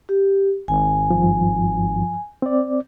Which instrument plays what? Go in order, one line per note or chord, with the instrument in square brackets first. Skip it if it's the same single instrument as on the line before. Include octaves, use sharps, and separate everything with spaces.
[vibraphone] G4
[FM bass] G#1 [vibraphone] G#5
[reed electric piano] G2 F3
C4 D5